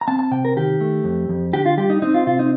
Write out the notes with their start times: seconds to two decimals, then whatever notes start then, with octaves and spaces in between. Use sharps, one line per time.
0.01 A#5
0.08 C4 A5
0.19 A5
0.31 C3 G5
0.45 A#4
0.56 D#3 G4
0.81 A3
1.04 F2
1.29 F2
1.53 D3 G4
1.66 F4
1.77 G3 G4
1.90 D#4
2.02 C4 D#4
2.14 F4
2.27 C3 F4
2.39 D#4